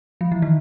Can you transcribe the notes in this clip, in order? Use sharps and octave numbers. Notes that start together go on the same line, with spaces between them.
F3
E3
D#3